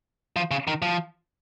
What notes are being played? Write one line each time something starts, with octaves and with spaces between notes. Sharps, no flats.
F3
C#3
D#3
F3